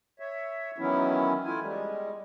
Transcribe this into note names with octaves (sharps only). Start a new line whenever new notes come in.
C#5 E5
D#3 E3 F#3 B3 C#4 E4
A3 E4 F4 G#5
G3 G#3